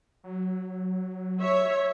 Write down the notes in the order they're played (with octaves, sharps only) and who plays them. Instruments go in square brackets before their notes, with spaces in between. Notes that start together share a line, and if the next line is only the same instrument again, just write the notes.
[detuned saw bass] F#3
[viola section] C#5 E5